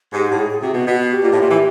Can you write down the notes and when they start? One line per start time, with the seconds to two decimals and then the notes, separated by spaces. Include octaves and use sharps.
0.13 G#2 G4
0.25 G4
0.31 A2
0.37 G#4
0.49 G#4
0.61 C3 F#4
0.73 B2 F#4
0.86 B2 F#4
0.99 F#4
1.11 G4
1.22 A#2
1.32 A2
1.42 A#2
1.50 E3